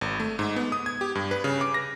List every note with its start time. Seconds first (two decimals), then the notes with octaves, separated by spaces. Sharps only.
0.01 G#1
0.20 A3
0.39 G#2
0.56 B3
0.72 D#6
0.86 G#6
1.01 G4
1.15 G2
1.31 B4
1.44 C#3
1.61 D6
1.74 A#6